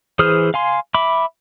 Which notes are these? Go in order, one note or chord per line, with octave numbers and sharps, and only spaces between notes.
E3 G#4 C5 D#6 F6
F5 G#5 C6
E5 B5 D6